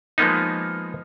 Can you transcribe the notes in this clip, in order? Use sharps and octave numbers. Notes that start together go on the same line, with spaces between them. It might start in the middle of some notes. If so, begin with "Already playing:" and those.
F3 G#3 A#3 B3 D#4